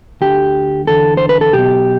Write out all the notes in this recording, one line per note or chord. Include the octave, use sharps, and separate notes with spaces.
D2 D3 G4
E2 D3 A4
C5
B4
A4
B1 B2 G4